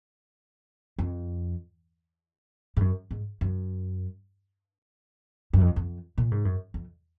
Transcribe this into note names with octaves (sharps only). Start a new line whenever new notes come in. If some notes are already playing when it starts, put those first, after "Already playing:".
F2
G#2
F#2
G#2
F#2
F#2
F2
F2
A#2
G#2
F#2
F2